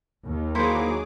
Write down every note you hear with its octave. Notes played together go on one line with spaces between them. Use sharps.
D#2
F#3 A#3 D#4 E4 G#4 C5 D6